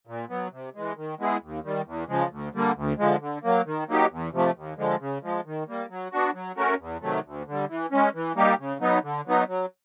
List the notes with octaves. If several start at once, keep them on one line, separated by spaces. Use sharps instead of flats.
A#2
F#3 B3
C3
E3 G#3
D#3
G#3 B3 E4 G#4
D#2
D#3 G3
E2
C#3 F3 G#3
D2
D3 G3 A#3
D2
D3 F3 G#3
D3
F#3 A#3
D#3
F#3 A#3 D#4 G4
E2
C3 F3 A3
D#2
D3 F3 G#3
C#3
F3 G#3
D#3
G3 A#3
F#3
B3 D4 F#4
F#3
A3 C#4 F#4 A#4
E2
C3 D#3 F#3 A3
D2
D3 G3
E3
G#3 C#4
E3
G3 A#3 D#4 G4
C#3
F#3 B3 D#4
D3
F#3 B3 D#4
F#3